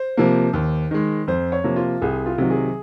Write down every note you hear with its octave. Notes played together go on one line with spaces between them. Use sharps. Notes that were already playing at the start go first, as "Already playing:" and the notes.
Already playing: C5
C3 F3 A#3
D#2
D#3 G#3
F2 C5
C#5
C3 F3 A#3
F4
C2 G#4
F4
C3 D#3 F#3
G#4